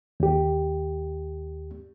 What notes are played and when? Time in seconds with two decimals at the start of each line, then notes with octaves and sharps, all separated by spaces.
0.20 D#2 G4